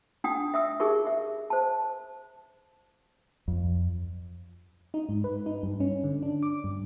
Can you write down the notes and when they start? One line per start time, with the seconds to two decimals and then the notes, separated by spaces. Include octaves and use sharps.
0.24 D4 D#4 F#5 G5 D#6
0.54 E5 D#6 E6
0.80 D#4 G4 G#4 A#4 E5 C#6
1.07 E5
1.50 C5 A5
3.48 F2
4.94 D#4
5.09 G#2
5.24 B4
5.46 D#4
5.63 G2
5.80 C#4
6.04 D3
6.23 D4
6.43 D6
6.64 G2